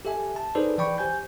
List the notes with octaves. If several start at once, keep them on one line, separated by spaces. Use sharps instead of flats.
G4 A4 E5 G#5
A5
D#4 G#4 A4 B4 C5 D5
E3 D5 G5 B5 C#6
G4 C5 G#5 G6